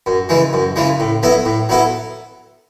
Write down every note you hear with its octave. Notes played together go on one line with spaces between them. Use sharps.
F#2
C#3 E3 G#3
F#2
C#3 E3 G#3
A2
F#3 B3 E4 A4
A2
F#3 B3 E4 A4